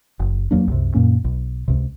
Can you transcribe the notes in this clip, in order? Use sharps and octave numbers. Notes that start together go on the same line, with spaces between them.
F#1
E2 F#3 A#3 D4
C2 F#2 C3
F#2 A#2 A#3 C#4
B1
C#2 C3